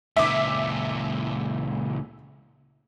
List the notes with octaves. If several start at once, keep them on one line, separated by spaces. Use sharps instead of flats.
C#2 A#2 E5 D6